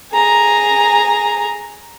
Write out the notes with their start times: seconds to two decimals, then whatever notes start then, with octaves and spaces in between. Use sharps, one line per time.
0.13 G#4 A#5